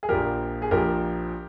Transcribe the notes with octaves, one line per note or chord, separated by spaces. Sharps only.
G#4
A#1 A#2 F3 G4 A#4
G#4
A#1 A#2 F3 G4 A#4